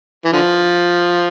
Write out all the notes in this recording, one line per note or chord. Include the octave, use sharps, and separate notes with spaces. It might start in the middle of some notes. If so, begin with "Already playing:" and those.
E3
D3 F3